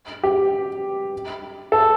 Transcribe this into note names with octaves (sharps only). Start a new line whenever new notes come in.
G4
A4